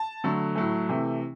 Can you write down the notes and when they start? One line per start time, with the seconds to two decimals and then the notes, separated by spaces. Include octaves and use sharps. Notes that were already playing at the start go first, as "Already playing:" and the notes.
Already playing: A5
0.24 D3 F#3 A3
0.56 A2 F#3 A3
0.89 C3 E3 A3